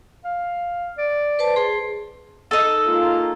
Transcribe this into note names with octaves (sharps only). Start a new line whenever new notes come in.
F5
D5
B4 C5 A5
G#4 C6
D#4 A4
G#3 A#3 F4